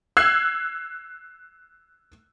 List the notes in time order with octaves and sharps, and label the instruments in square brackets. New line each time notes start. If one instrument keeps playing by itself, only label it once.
[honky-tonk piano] E6 F#6 G#6 C7